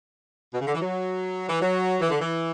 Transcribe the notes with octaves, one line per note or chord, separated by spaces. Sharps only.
B2
C#3
D3
E3
F#3
E3
F#3
E3
D3
E3